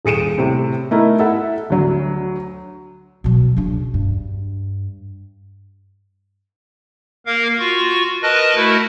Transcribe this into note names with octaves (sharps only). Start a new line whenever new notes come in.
D#1 G#4 C#7 D7 E7
A2 C3
A3 D#4 E4 A#4
E4 A4 E5 F#5
D2 F#3
B2 F#3
C#3 D4
G2
A#3 A#4 F5
F4 F#4 C#6
A#4 B4 D#5 A5 F#6 A#6
A3 E4 F#4 A#4